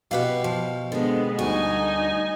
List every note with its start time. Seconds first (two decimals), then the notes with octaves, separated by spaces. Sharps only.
0.11 B2 F#4 G4 B4 F5
0.44 F3
0.92 D3 G#3 B3 C4
1.39 D2 G3 D#4 F#4 G#5